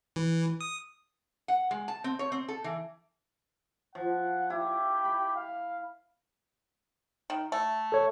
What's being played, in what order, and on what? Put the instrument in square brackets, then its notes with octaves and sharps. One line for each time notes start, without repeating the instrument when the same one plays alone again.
[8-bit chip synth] E3
D#6
[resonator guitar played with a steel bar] F#5
G#3
A5
C4
C#5
C4
A4
E3
[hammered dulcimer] F3 [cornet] F#5
[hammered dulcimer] E4 [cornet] G4
[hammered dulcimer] B5
[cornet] F5
[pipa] D#3
A3
[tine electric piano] A4 C#5